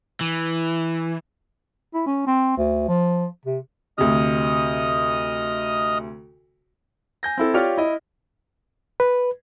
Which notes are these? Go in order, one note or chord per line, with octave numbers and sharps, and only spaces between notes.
E3
E4
C#4
C4
D2
F3
C3
D2 C3 D#5 D#6 F6
G#5 G6 A#6
C4 E4 A4
F4 G4 C#5 D5 F6
E4 D#5
B4